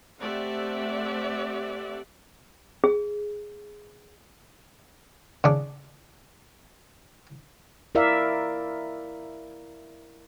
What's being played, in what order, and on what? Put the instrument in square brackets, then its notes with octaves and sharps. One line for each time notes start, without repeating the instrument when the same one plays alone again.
[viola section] A3 C4 G4 D5 E5 F#5
[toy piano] G#4
[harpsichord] C#3 D4
[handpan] E4 A#4 D5 E5 F5